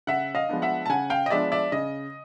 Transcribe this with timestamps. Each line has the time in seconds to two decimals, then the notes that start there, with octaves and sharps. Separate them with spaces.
0.07 C#3 E5 F#5
0.35 D#5 F5
0.49 F3 G#3 B3 D4
0.62 E5 F#5
0.86 A5
0.89 C#3 F#5 G#5
1.10 F5 G5
1.26 D#5
1.30 F3 G#3 B3 D4 D5 E5
1.52 D5 E5
1.72 C#3 D#5